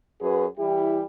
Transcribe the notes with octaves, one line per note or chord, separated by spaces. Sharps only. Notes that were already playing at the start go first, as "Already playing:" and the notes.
F#2 F#4 G#4 B4
E3 G3 E4 G4